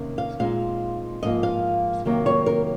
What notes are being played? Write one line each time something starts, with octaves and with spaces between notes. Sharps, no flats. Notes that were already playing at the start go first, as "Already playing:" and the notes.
Already playing: C3 D#3 A#3 C#4
F5
A#2 G#3 C4 D#4 F5
G#2 F3 A#3 D#5
F5
C3 D#3 F#3 A#3
C#5
A#4